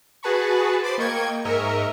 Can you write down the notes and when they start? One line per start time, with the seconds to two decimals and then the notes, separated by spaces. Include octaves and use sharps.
0.23 F#4 G#4 B4 A5 B5 C#6
0.83 C5 B5 D6 A6 C7
0.98 A#3 D#5 G5 C#6 G#6
1.45 G#2 A#4 D#5 E5 C#6